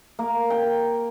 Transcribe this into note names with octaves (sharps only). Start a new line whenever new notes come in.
A#3
G5
G5